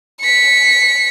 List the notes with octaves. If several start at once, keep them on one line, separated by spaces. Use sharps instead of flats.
B6 C#7